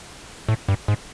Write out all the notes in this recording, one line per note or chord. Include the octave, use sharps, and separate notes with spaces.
A2
G2
G#2